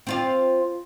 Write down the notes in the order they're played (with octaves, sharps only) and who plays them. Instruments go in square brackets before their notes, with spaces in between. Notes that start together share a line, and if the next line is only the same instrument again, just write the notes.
[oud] C4 F4 D5